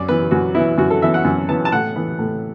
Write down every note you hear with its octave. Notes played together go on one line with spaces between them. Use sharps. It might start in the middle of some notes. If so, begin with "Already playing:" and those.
Already playing: F#2 D5
E3 B3 B4
F#2 F#4
E3 B3 E4
F#2 F#4
A4
E3 B3 E5
F#5
F#2
E3 B3 A5
A5
A2 F#5
E3 B3
A2